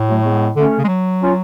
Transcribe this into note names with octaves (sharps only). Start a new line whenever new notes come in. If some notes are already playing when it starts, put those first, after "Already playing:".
Already playing: A2
F#3 A3
G#3 B3
D3 A3 C#4
C#3
G#3
F#3
C#4 F4